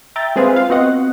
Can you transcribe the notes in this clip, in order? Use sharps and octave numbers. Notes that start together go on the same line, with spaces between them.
E5 G5 A#5 A6
G#3 C4 G#4 B4 C5 F5
F4 F5
B3 C4 F#4 D#5 F#5